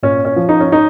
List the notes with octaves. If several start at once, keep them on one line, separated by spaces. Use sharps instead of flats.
A#2 C#4
C#4
F3
D#4
C#4
D#4